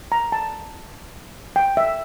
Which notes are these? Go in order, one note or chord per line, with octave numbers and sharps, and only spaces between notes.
A#5
A5
G5
E5